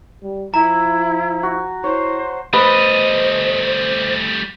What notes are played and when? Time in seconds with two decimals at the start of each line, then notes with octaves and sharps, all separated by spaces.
0.23 G3
0.54 F3 E4 A#5
1.43 F#4
1.84 E4 C5 C#5
2.53 G3 A3 D4 B4 C5 D#5